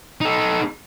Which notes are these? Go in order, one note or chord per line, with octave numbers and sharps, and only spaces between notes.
D#4 A4